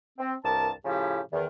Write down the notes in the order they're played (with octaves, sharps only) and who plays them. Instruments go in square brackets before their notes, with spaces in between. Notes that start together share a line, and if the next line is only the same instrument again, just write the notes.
[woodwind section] C4
C2 G2 A#4 A5
A2 C#3 F3 C#4 E4 G4
E2 D#3